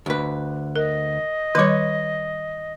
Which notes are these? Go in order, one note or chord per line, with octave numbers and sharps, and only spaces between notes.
D2 B4
A#4 D#5
D#3 G3 B4 C#5